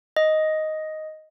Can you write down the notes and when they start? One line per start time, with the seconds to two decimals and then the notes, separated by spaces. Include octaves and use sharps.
0.16 D#5